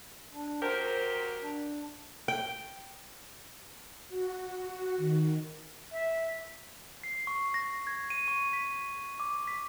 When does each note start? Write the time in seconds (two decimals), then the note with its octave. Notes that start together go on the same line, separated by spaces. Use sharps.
0.32 D4
0.62 F#3 G4 A#4 C5
1.42 D4
2.28 G5
4.08 F#4
4.56 F#4
4.97 D#3
5.92 E5
7.04 C7
7.27 C#6
7.54 A#6
7.87 G#6
8.10 D#7
8.28 C#6
8.53 B6
9.20 D6
9.48 B6